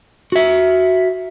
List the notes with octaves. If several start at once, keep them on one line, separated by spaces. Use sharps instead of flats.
F#4 E5